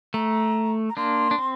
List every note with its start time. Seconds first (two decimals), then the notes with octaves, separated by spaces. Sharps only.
0.14 A3 A#5
0.90 A#5
0.97 A#3 D4 C6
1.31 D4
1.38 C4